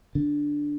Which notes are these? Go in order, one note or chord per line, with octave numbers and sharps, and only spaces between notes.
D3